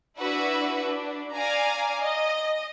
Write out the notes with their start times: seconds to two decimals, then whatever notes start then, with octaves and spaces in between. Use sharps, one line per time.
0.16 D4 E4 F#4 B4 E5
0.82 D4
1.33 D5 F5 G#5 A#5
2.00 D#5